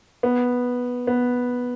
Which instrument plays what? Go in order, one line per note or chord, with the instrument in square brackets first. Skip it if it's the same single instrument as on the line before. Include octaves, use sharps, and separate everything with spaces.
[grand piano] B3
B3